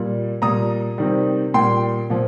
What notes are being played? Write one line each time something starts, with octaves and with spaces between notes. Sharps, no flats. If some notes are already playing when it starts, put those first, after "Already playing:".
Already playing: A#2 G3
A#2 G3 A#5 D#6
C3 D#3 G3
A#2 G3 G5 C6
A#2 F3